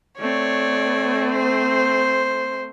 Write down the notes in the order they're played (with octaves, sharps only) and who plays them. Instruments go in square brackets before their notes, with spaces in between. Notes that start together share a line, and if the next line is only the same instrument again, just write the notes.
[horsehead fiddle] A3 C4 [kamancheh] C#5 D5
[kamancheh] C5